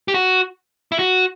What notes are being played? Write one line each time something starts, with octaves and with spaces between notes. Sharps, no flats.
G4
F#4
E4
F#4